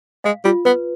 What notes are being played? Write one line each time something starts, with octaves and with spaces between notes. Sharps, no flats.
G#3 F5
G3 F4
B3 B4